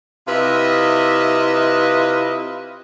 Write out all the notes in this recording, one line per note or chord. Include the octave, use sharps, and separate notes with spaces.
C3 E4 F4 B4 D#5 E5